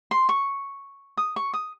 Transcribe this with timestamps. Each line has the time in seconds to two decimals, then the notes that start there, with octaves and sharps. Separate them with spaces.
0.11 C6
0.29 C#6
1.17 D#6
1.36 C#6
1.53 D#6